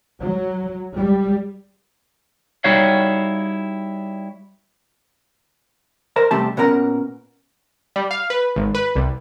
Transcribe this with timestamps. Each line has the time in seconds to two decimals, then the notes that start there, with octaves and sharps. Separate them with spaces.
0.21 F#3
0.95 G3
2.64 G3 D#4 E4 F#4 C#5 F5
6.16 A#4 C5 A#5
6.31 E2 C3 G3 A3 C4 A5
6.57 A#2 B3 C#4 A#4 F#5 A#5
7.96 G3
8.11 F5
8.30 B4
8.56 G#1
8.75 B4
8.96 C2